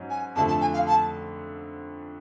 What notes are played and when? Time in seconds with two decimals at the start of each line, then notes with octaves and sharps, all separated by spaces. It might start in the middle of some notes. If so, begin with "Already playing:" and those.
Already playing: G#2 F#3 C#4
0.10 G#5
0.36 F2 D3 F3 A3 A5
0.48 A5
0.61 G#5
0.74 F5
0.87 A5